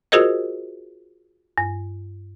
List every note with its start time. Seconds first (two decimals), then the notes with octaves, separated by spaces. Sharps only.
0.12 F4 F#4 G#4 A#4 C5 D#5
1.58 G2